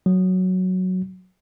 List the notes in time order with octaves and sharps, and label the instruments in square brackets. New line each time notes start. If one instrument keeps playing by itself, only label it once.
[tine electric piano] F#3